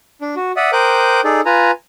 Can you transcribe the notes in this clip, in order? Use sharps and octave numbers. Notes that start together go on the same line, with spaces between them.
D4
F#4
D5 E5 F#5 D#6
A#4 C5 G5 D6 D#6 F#6
D#4 G#4 A4 D5
F4 B4 G#5 A#5